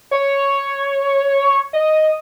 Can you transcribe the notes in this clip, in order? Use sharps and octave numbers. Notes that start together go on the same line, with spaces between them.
C#5
D#5